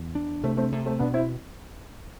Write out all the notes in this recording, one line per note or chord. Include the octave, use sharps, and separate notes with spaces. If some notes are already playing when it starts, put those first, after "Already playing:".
Already playing: E2
D4
C3 A3 C4
A3 C4
C3 A3
A3 C4
B2 B3 D4
C4 E4